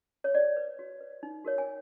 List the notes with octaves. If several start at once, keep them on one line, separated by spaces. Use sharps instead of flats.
C#5
F#4 D5
B4
F#4
B4
D#4
F#4 A#4 C#5
G#5